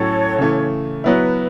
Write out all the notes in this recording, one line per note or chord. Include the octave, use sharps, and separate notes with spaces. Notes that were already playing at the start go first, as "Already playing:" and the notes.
Already playing: A2 F#3 C#4 F#4 A4 C#5
C#3 E3 A3
F#3 B3 E4 B4